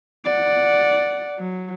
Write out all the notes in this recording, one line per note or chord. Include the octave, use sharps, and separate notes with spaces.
D5 F#5
F#3